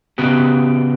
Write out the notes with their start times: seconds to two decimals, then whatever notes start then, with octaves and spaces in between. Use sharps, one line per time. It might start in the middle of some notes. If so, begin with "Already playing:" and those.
0.18 C#3 B3 F#4 G4